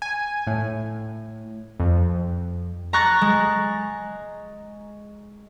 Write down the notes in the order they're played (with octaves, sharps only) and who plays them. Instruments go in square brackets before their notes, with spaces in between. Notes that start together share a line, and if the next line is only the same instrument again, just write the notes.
[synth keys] G#5
A2
F2
[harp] A#5 C#6 F#6 A6 A#6
G#3